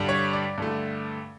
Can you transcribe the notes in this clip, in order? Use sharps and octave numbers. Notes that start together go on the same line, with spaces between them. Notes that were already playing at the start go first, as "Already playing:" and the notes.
Already playing: G2 D3 G3
C#5
D5
G2 D3 A3